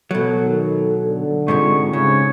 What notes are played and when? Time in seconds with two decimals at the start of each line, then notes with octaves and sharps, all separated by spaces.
0.11 B2 F#3 A4
0.43 D#3
1.02 D3
1.48 G#2 C3 G#3 F4 C#6
1.93 G#2 C#3 C#4 C#5